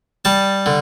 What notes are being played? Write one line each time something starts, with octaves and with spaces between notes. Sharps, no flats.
G3 A5
D3